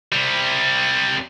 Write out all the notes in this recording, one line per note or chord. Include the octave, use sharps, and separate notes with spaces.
C3 G3